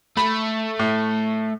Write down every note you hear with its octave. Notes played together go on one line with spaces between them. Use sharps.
A3 B5
A2